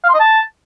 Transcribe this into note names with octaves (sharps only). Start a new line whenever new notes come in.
F5
C6
D#5
A5